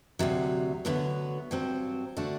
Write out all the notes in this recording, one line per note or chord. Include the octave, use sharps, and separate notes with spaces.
D2 C3 F#3
D2 D3 F#3 B3
G2 F#3 C4
D3 A3 D4 F#4